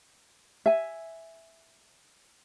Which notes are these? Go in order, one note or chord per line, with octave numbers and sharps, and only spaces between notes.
E5 G#5